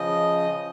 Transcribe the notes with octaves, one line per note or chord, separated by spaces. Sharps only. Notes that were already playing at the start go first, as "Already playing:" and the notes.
Already playing: C#3 F3 D#5